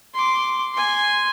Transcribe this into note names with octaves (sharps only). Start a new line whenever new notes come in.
C6 D6
G#5 C6